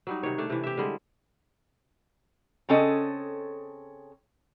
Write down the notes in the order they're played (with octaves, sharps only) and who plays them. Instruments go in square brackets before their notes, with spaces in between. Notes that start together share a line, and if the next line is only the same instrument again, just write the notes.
[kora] F#3 G3 D#4
C3 D#3 C#5
A3 D4
C3 E3
G4 E5
D3 G3 G#3
[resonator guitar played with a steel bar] C#3 C4 C#4 A4 D#5